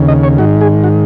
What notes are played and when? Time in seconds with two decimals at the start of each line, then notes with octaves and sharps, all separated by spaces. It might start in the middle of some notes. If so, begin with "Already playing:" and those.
Already playing: D#2 C#3
0.08 D#5
0.23 C#5
0.38 G#2 D#3 F#4
0.61 G#4
0.84 F#4